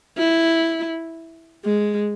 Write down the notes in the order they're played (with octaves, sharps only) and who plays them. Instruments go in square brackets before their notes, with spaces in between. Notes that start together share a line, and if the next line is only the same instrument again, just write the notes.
[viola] E4
G#3